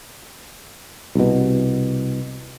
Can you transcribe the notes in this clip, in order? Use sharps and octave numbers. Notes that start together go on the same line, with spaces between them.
C2 B2